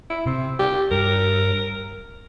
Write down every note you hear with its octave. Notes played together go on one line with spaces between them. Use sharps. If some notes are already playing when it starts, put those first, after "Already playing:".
E4
C3 C4
G4
G2 A#4